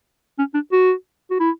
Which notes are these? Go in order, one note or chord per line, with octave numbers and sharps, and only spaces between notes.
C#4
D4
F#4
F#4
E4